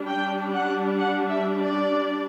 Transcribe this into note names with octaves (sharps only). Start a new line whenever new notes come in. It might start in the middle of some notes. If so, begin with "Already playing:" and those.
Already playing: G3 D4
G5
F#5
F#5
E5
D5